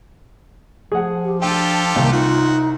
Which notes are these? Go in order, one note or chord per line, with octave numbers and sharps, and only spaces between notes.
F3 G#4 F#5
G4
D4 F4 G4 A4 G5
C2 D#3 A#3
D#4 F4 F#4